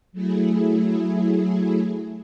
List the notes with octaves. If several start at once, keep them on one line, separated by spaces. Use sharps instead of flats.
F#3 A3 E4 G#4